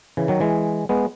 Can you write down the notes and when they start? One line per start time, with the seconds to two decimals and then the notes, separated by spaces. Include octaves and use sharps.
0.17 C#3 E3
0.28 D#3 F#3
0.40 E3 G#3
0.89 G#3 B3